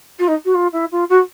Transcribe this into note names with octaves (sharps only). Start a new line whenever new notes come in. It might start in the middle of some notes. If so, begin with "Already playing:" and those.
F4
D#4
F#4
F4
E4
F4
F#4